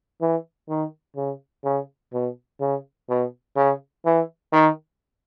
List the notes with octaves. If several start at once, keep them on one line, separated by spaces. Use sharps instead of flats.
E3
D#3
C#3
C#3
B2
C#3
B2
C#3
E3
D#3